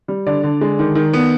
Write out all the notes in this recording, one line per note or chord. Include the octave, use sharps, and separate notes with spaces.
G3
D3 D5
D3
G#3
D#3
D#3
B3